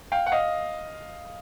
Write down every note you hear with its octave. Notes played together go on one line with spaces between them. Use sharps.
F5 G5
F#5
D#5 F5